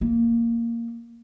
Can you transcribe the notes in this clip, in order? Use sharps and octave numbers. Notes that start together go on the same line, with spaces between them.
A#3